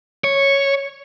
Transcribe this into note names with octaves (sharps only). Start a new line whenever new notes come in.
C#5